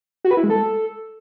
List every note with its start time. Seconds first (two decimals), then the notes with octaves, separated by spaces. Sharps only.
0.25 F#4
0.31 B4
0.37 E4
0.43 G#3
0.50 A4